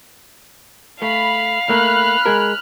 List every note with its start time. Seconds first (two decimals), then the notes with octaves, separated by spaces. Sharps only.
1.02 A3 F5 B5
1.69 A3 A#3 B5 F6 F#6
2.26 G#3 G#4 A#4